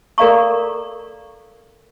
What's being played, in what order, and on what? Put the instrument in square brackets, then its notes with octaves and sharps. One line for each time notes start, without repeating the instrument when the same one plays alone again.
[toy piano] A4 A#4 D5 F5 A#5 C#6